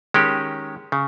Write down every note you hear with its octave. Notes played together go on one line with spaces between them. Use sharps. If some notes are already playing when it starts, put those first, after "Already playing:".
D#3 G#3 C#4 G4
C#3